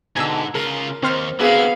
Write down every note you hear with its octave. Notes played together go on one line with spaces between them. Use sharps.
G#2 B2 D3 G#5 A#5 E6
C#3 F4 A#4
D#2 C4 C5 F6
D3 A#3 B3 E4 F#4 G#4 F5